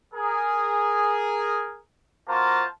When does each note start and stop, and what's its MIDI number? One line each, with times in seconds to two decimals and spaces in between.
0.14 1.78 68
0.14 1.78 70
2.28 2.65 58
2.28 2.65 65
2.28 2.65 66
2.28 2.65 72
2.28 2.65 81
2.28 2.65 82